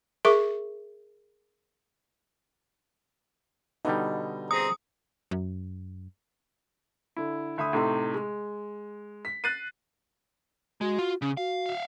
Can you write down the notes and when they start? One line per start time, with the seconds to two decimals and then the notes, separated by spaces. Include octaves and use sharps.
0.25 G#4 A#4 E5 C#6 D6
3.85 B2 D3 G3 D#4
4.51 C4 G#4 A#5 D#6
5.31 F#2
7.17 D3 E4
7.58 D2 E5 B5 D#6
7.73 A2 C3 A3 D#4 E5 C6
8.15 G#3
9.25 B6
9.44 F#6 A6 C7 D#7
10.81 G#3 F#4
10.98 F4
11.22 C#3 C#4
11.37 F#4 F5
11.66 E5 F5